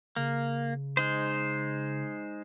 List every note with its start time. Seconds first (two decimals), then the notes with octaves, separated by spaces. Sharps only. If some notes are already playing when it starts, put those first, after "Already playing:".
0.16 C#3 A#3
0.97 G#3 D#4 C5